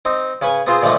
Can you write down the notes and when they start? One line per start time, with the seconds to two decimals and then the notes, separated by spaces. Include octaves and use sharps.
0.05 C4 D#4
0.42 C#3 C#4 B4 G#5 C#6
0.67 B3 C4 F4 G#4 C5
0.83 A#2 D3 D#3 F3 A3 A#3